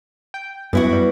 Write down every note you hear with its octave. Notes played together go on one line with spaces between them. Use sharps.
G5
F#2 B3 E4 F#4
G3